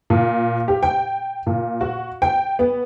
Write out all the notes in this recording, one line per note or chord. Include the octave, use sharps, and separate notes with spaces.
A#2
G4
G5
A#2
F#4
G5
B3